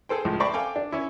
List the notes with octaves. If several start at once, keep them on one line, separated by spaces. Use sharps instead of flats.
G#4 A4 C5 G5
C#2 A2 F3
C5 D5 E5 A#5 B5 C#6
A4 F5 G5 G#5 D6
D4
C#4 E4